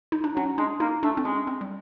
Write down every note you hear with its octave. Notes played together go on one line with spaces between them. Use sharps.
D#4
D4
F#3 C#4
G#3 D4
A#3 D#4
A3 D4
C4
G#3 C#4
C4
G3